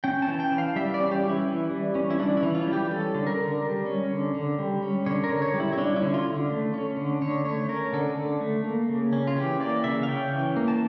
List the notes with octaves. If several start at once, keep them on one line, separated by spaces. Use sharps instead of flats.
C#4 G5
A5
E3
G5
E3
F5
G3 E5
D5
C#4
G4
E3
E4
E3
G3
C#4
E4
E3 D4
E4
E3
F4
G3
G4
C#4 A4
D3
A#4
D3
G3
C#4
D3
D3
G3
C#4
D3 C#5
A#4
D3
C#5
G3
E4
E4
C#4 D4
E4
D3
F4
D3
A3
C#4
D3
D3 C#5
A3 C#5
C#4 A#4
D3 A4
D3
A3
A#3
C#3
C#4
F4
E3 G4
A#3 D5
C#3 E5
F5
C#4 G5
E3
A#3
A5